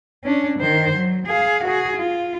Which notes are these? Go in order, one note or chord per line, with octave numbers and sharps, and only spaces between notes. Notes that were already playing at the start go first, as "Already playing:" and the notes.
C#4 D4
D#3 C5
F#3
G#4 F5
F#4 G#4
F4